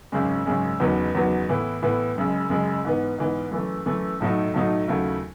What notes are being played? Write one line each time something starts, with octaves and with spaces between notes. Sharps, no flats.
G#1 F#2 C#3 G#3 C#4
G#1 F#2 C#3 G#3 C#4
F#1 E2 D#3 F#3 B3
F#1 E2 D#3 F#3 B3
A2 E3 B3 E4
A2 E3 B3 E4
F#1 F#2 C#3 G#3
F#1 F#2 C#3 G#3
G#2 E3 B3
G#2 E3 B3
F#2 E3 A3
F#2 E3 A3
B1 A2 F#3 A3 D#4
B1 A2 F#3 A3 D#4
D#2 C#3 F#3 A3 E4